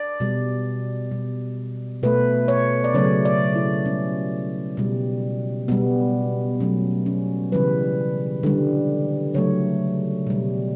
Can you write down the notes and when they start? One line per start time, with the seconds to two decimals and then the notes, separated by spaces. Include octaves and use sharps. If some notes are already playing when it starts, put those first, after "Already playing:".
Already playing: D5
0.20 B2 G3
1.11 B2 G3
2.03 B2 A3 B4
2.48 C#5
2.84 D5
2.94 C#3 F#3 A3 C#5
3.25 D5
3.56 E4
3.86 C#3 G3 C#4
4.77 B2 G3
5.68 B2 G3 B3
6.60 B2 F#3 A3 C#4
7.06 C#4
7.52 C#3 E3 G3 B4
8.43 D3 G3
9.34 C#3 F#3 A3 C#5
10.27 B2 G3